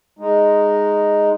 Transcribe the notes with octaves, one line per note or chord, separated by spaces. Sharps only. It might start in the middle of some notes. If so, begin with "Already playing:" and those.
G#3 D#4